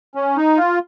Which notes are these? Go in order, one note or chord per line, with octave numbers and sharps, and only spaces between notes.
C#4
D#4
F4